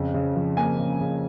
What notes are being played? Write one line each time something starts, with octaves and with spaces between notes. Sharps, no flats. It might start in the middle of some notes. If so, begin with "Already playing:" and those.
Already playing: F2 C#3
C#3
F3
A#3 G#5
C#3
C#3